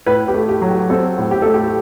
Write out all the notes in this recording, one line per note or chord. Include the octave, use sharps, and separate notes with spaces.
A2 B4
G4
A3
G4
F#3
G4
C4 A4
A2
G4
A3 A4
G4